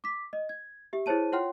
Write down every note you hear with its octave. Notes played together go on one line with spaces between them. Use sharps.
D6 B6
D#5
G#6
G4 E5
E4 G#4 C5 C#5 A5 D#7
F4 C#5 F#5 G5 C6 F6